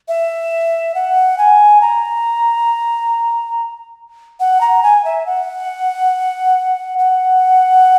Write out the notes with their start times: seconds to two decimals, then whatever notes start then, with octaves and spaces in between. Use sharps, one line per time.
0.08 E5
0.95 F#5
1.38 G#5
1.81 A#5
4.40 F#5
4.61 A#5
4.83 G#5
5.04 E5
5.26 F#5
6.98 F#5